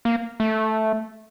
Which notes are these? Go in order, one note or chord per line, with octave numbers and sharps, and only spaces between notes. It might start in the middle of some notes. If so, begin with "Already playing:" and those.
A#3
A3